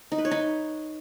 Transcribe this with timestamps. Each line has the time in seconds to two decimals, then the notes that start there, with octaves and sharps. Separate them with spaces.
0.12 D#4
0.18 B4
0.25 C#5
0.31 D#4